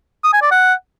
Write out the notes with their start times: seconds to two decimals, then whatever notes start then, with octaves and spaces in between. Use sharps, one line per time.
0.24 D#6
0.33 G#5
0.42 D5
0.51 F#5